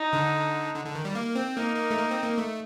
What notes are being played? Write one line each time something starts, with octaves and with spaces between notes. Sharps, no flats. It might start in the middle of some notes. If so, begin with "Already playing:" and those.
Already playing: D#4
D3
D3
D3
D#3
G3
A#3
C4
A#3 D#4
A#3
A3
A#3
C4
A#3
A3